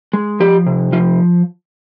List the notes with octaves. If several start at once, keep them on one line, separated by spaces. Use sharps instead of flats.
G#3
F3 G4
C3
F3 F4